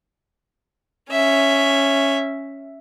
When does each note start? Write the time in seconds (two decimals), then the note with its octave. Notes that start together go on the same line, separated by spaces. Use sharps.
1.10 C#4 E5